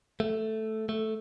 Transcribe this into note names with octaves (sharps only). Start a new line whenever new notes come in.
A3
A3